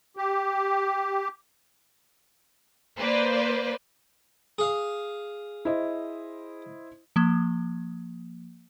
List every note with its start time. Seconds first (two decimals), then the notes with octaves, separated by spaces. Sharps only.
0.17 G4
2.98 A#3 B4 C5 D5
4.58 G#4 F5
5.65 E4 C5 D#5
7.16 F3 A#3